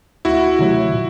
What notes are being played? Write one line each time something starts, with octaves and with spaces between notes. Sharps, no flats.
D2 E4 F#4
C3 D#3 F#3 A3
A#2